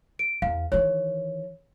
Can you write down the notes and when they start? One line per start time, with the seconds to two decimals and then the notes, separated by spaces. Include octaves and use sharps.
0.19 D7
0.42 E2 F5
0.72 D#3 E3 C#5